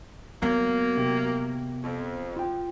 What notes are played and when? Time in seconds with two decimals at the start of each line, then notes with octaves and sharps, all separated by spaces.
0.42 F#3 A#3 B3
0.97 C3 G4
1.84 F2
2.36 F4 G5